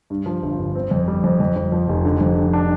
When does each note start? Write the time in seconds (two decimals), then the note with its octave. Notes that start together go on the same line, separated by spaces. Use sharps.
0.10 G2
0.26 F3
0.43 G1
0.59 G1
0.75 C4
0.91 F2
1.08 G3
1.24 F2
1.40 F2
1.56 F2
1.72 F3
1.89 F1
2.05 D3
2.21 F2
2.38 D3
2.53 D4